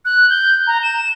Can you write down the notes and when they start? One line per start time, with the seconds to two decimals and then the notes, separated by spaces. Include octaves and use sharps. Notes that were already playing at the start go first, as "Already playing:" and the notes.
0.05 F#6
0.30 G6
0.67 A#5
0.83 E7